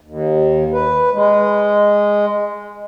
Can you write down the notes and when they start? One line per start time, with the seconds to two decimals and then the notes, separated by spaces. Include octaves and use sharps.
0.01 D#2
0.72 B4
1.13 G#3